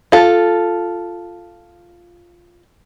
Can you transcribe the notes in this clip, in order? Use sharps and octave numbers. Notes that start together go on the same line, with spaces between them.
F4 A4